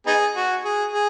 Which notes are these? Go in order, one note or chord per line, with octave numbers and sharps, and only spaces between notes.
B3 D#4 G#4
F#4
G#4
G#4